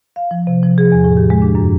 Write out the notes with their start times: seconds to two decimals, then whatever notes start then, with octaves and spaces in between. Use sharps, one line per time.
0.16 F5
0.31 F3
0.47 C3
0.63 F3
0.78 G#4
0.92 E2
1.04 A2
1.17 G4
1.30 G#3
1.42 D4
1.55 F#2